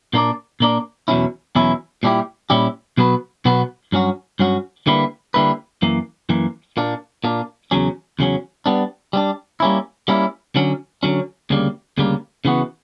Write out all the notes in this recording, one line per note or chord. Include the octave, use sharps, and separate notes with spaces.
A#2 A#3 D4 A#4 D5
A#2 A#3 D4 A#4 D5
E2 B2 F#3 C#4 E4
E2 B2 F#3 C#4 E4
A#2 G3 C#4 E4 G4
A#2 G3 C#4 E4 G4
B2 F#3 B3 F#4 B4
B2 F#3 B3 F#4 B4
G2 F#3 C#4 F#4
G2 F#3 C#4 F#4
D3 G3 A#3 E4 B4
D3 G3 A#3 E4 B4
F#2 E3 A#3
F#2 E3 A#3
A#2 A#3 D4
A#2 A#3 D4
E2 C#3 F#3 C#4
E2 C#3 F#3 C#4
G3 B3 D4
G3 B3 D4
G3 A#3 C#4 E4
G3 A#3 C#4 E4
D3 F#3 C#4
D3 F#3 C#4
D2 C#3 G3 A#3
D2 C#3 G3 A#3
C#3 E3 B3 F#4